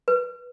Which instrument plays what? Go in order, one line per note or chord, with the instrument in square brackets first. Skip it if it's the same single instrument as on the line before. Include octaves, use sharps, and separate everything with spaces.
[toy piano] B4